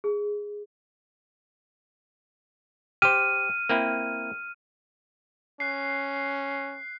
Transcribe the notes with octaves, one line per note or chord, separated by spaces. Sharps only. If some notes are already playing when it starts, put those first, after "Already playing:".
G#4
G4 C5 F6 D#7
A#3 C4 E4
C#4 F#6 C7